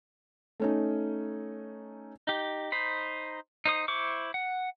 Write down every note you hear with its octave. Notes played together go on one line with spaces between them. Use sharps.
A3 C#4 D#4
D#4 G4
D#4 C5 B5
D#4 C5 D#6
E4 C5 C#6 D6
F#5